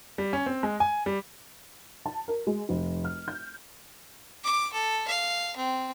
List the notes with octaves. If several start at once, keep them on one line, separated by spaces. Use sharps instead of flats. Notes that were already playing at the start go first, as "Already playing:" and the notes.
G3
C#4
C4
G#3
G#5
G3
A5
A#4
G#3
F1
F6
G6
D6
A4
F5
C4